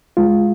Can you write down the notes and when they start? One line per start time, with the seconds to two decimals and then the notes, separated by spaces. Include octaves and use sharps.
0.17 G#3 F4